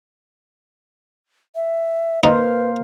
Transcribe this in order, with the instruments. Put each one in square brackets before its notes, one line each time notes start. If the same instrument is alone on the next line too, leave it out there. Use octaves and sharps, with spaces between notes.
[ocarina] E5
[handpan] A#3 C5 F5 [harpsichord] D#4 [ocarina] B4